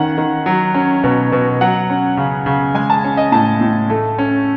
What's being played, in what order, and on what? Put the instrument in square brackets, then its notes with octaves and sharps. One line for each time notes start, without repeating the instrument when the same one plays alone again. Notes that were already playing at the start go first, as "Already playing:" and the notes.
Already playing: [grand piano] D#3 C#4 F#5
D#3
F#3
C#4
B2
B2
F#3 F#5
C#4
C#3
C#3
G#3 G#5
A5
C#4
D#5
A2 A5
A2
A3
C#4